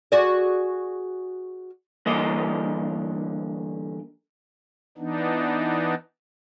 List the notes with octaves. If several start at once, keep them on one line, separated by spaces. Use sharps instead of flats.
F#4 G#4 D5
G2 D3 E3 A#3 A#4 D#5
E3 B3 D4 D#4